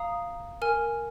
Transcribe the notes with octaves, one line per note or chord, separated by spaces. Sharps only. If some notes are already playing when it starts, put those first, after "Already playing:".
Already playing: F5 A#5 D#6
A#4 G#5 F6